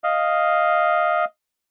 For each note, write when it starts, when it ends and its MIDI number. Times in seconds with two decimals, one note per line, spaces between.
0.04 1.25 75
0.04 1.25 77